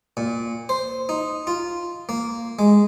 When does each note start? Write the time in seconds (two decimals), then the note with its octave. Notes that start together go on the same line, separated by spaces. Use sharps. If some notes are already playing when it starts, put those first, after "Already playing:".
0.17 A#2
0.69 C5
1.09 D#4
1.47 F4
2.09 A#3
2.59 G#3